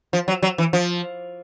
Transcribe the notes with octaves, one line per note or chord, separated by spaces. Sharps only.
F3
F#3
F#3
E3
F3